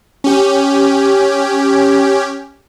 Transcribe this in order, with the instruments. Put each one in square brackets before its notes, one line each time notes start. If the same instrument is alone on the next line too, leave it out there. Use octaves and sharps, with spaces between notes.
[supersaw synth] C#4 G4